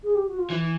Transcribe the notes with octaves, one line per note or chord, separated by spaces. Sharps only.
G#4
G4
F#4
F4
E3 E4